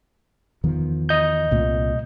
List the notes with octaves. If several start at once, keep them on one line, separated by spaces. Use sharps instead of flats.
E2 D#3 F3
D#5 G6
C2 A#2 A3